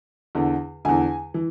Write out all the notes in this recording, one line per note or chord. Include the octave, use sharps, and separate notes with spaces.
E2 D3
E2 D3 G#5
E3